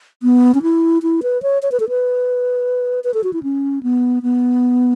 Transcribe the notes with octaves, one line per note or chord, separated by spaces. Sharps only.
B3
C#4
E4
E4
B4
C#5
C#5
B4
A4
B4
B4
A4
F#4
E4
C#4
B3
B3